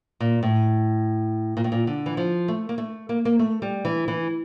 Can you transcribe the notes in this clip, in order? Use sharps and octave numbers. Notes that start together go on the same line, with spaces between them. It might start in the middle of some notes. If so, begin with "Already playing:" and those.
A#2
A2
A#2
A2
A#2
D3
E3
F3
A3
A#3
A3
A#3
A#3
A3
G3
E3
E3